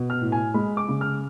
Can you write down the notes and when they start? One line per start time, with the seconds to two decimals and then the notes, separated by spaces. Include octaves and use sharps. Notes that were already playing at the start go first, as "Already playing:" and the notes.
Already playing: B2
0.10 F6
0.21 A2
0.32 G#5
0.54 G#3 B5
0.77 D6
0.88 C#3
1.01 F6